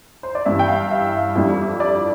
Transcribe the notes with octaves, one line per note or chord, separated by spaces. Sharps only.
C5
D5
G2 E3 G3 E5
G5
F5
E5
F2 E3 G3 D4
D5